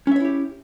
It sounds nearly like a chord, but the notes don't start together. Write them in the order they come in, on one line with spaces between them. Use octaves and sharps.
C#4 E5 C#5 E4 G4